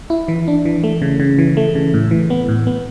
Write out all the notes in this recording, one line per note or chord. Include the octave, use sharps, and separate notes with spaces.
E4
E3
D4
E3
A3
C#3
C#3
E3
A3
C#3
A2
E3
B3
A2
B3